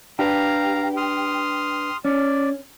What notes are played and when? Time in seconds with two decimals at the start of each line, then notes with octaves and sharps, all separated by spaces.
0.19 D4 G4 B4 F5 A#5
0.97 C6 D#6 F6
2.05 C#4 D5